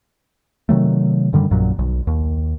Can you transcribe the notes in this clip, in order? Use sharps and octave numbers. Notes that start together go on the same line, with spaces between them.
C3 D#3 F#3 A3
F#2 D3 D#3 G3
A#1 F#2 A#2 F#3
B1
D#2